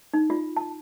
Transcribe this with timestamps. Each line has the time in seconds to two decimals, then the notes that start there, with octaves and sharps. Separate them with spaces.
0.13 D#4
0.30 F4
0.57 A5